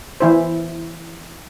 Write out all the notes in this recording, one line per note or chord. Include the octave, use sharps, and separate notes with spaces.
E3 E4 C5